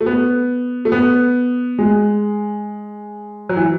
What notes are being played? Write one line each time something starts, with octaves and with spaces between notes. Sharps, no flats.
A3
B3
A3
B3
G#3
F#3
E3